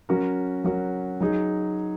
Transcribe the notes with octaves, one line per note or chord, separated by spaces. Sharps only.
F#3 C#4 F#4 A#4
F#3 C#4 F#4 A#4
F#3 D#4 G#4